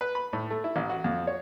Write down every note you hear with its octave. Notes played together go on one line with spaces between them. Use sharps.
B4
B5
A2
A3
E4
A1
F#4
F2
C#5